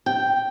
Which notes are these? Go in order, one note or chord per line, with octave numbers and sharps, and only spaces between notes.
G5